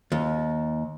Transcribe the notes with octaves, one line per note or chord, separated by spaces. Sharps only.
D#2